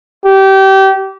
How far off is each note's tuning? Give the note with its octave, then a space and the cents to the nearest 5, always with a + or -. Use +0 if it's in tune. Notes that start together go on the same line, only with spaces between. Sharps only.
G4 -25